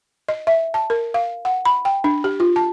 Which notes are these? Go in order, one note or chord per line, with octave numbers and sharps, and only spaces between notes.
D#5
E5
A5
A#4
F5
F#5
B5
G5
D4
G4
F4
A5